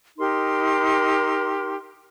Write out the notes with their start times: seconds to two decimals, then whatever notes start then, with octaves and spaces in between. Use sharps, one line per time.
0.17 D#4 G4 A#4 C6